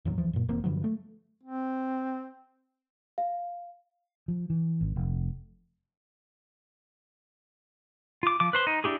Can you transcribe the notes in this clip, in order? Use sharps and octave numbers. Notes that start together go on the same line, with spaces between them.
E2 A2 D#3 F#3
D2 E3 F3
F#2 A#2
F1 E2 A#3 C4
G2 D3 F3 F#3
A3
C4
F5
F3
E3
G#1
F1
F4 D6
F3 D6
B4 C5 C6
D#4
D4 E4 G4 G#4